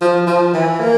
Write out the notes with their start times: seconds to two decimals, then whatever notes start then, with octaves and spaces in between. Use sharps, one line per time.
0.01 F3
0.27 F3
0.53 E3
0.80 A#3